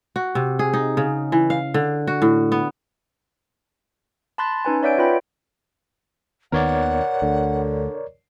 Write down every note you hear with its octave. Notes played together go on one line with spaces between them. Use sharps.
F#4
C3
G#4
D#4
C#3
E3
F5
D3
F#4
A2
B3
A5 B5 C6 F#6 A6
C#4 D#4 B4 G#5
C#5 D5 E5 F#5 G6 D7
F4 B4 G5 B5
D#2 D#3 B3 A#4 C#5 D5 F#5
D2 D3